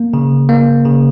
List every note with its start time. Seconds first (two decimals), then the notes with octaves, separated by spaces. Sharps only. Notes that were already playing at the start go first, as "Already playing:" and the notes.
Already playing: A#3
0.14 C#3
0.49 A#3
0.85 C#3